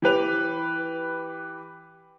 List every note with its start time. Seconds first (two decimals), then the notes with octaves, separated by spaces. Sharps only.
0.02 E3 G4 B4 F7